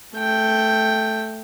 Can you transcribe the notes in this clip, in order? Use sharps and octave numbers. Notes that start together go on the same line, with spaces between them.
A3 G5